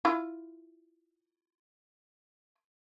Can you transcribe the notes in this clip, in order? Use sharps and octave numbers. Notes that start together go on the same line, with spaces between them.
E4 F4